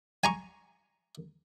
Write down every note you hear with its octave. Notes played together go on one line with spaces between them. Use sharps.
G#5 A#5 C#6